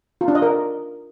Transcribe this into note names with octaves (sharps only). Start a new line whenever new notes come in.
F4
D4
D#5
A#4